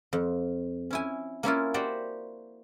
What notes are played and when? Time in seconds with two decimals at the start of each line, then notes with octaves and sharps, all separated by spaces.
0.13 F2
0.91 C#4 E4 G#5
1.43 A#3 C#4 E4 F4
1.74 F#4 G4 C5 D5 G5